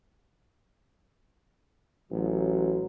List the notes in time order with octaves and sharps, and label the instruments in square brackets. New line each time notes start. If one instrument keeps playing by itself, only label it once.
[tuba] A1 [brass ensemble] F#3